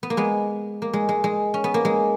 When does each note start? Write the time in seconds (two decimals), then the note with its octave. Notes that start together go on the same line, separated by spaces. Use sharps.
0.03 B3
0.10 A#3
0.17 G#3 B3
0.82 A#3
0.93 G#3
1.09 G#3
1.24 G#3
1.54 C#4
1.64 B3
1.74 A#3
1.85 G#3